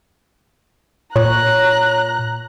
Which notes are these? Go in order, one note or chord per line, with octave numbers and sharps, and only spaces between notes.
A#2 C#5 A#5 F#6